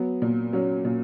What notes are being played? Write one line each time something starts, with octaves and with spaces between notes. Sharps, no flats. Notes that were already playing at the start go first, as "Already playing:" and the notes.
Already playing: F#3 B3
A#2
F#3 C#4
A#2